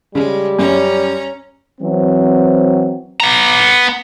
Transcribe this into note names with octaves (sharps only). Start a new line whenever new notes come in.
C#3 G3 G#3
F#2 C#4 A#5
E3 F#3 C4
B3 A#5